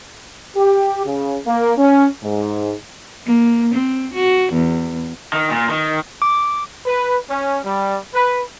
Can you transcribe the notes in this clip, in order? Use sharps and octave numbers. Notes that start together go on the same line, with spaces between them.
G4
C#3
A#3
C#4
G#2
A#3
C4
F#4
E2
D#3
A#2
D#3
D6
B4
C#4
G3
B4